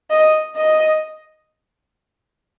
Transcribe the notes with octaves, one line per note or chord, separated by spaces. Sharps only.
D#5
D#5